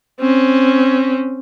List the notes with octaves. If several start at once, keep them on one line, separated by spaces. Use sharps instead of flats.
C4 C#4